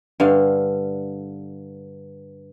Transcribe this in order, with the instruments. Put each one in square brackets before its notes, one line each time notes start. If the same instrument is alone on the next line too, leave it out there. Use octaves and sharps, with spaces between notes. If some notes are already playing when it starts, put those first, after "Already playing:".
[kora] G2 D3 F5